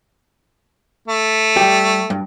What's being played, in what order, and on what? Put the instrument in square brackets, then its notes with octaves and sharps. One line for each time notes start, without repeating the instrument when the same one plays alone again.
[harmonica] A3
[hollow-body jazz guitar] G3 G4
G2